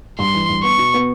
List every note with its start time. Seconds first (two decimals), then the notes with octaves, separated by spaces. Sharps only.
0.19 G2 C6
0.34 E3
0.49 G2
0.63 B3 C#6
0.78 B2
0.94 B3